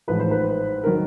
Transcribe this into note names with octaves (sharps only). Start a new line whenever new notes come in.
A1 G#2 F3 B4
C5
B4
D#3 F#3 A#4